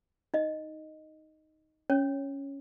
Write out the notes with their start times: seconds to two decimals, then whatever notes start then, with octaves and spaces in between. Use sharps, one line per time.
0.34 D#4 D#5
1.90 C#4 C#5